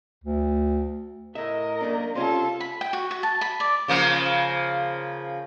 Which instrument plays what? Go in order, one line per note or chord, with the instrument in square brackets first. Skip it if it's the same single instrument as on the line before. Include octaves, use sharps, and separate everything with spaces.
[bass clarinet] D2
[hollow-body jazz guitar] A2 E5 [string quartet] A#4 [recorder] D#5
[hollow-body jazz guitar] F#2 A3 D4 [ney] A#3
[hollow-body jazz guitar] C3 G3 C#4 [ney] F4 [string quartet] A4 F5 [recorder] C6
[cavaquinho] B5
G5
F#4
F#4
A5
B5
D5
[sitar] C#3 F3 A#3